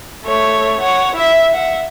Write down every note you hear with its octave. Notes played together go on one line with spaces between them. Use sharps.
A3 C#5
C#5 F#5
E4 E5
E5 F#5